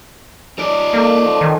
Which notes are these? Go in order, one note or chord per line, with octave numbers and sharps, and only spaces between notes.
D#4 D5
A#3 A4
F3 C#5
D#3 C#5 D#5 G#5